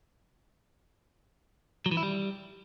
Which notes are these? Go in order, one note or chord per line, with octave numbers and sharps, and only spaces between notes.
F#3
E3
E4
G3